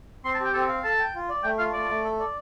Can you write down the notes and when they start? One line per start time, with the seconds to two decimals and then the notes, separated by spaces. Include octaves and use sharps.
0.24 C4 C6
0.34 A5
0.40 G4 G5
0.54 C4 A4
0.69 F5
0.84 A4 A5
0.99 G5
1.15 F4
1.29 D5
1.43 A3 G5
1.59 F4 F5
1.73 A3 D5
1.88 A3
2.04 A4
2.19 D5